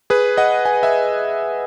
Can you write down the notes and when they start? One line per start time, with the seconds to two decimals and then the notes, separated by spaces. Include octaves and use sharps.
0.10 G#4 B4
0.37 D#5 F#5
0.65 G#5
0.83 E5 G#5